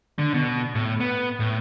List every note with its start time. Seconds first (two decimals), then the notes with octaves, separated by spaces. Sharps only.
0.19 D3
0.34 B2
0.75 A2
1.00 B3
1.40 A2